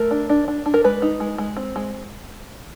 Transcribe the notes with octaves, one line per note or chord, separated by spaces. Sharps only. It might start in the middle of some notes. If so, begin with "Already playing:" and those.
Already playing: A3 A#4
D4
D4
D4
D4
A#4
G#3 B4
D#4
G#3
G#3
C4
G#3